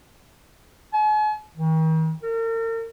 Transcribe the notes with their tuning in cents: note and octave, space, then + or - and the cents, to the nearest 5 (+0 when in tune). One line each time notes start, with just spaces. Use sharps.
G#5 +45
D#3 +45
A#4 -40